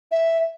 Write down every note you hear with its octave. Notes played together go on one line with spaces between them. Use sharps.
E5